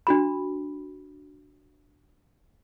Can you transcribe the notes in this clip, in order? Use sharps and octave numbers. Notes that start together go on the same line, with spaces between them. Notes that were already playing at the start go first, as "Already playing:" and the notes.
D4 F#4 B5